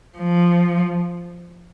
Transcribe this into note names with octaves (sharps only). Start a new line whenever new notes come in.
F3